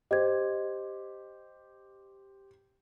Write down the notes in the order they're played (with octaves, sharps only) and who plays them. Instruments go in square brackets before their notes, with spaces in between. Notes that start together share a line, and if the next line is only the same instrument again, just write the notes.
[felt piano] G4 C5 [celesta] D#5 G#6